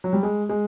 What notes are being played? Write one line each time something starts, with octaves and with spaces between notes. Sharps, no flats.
F#3
G3
G#3
G#3